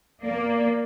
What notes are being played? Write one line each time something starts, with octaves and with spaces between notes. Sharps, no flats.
A#3 D5